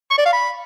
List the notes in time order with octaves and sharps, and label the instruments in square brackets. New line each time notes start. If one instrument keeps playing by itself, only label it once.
[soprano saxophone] C#6
D5
F5
B5